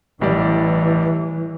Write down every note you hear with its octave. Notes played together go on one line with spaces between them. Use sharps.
A1 E3 G3 D5